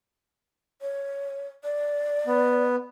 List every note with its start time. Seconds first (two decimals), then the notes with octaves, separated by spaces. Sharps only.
0.82 C#5
1.64 D5
2.27 B3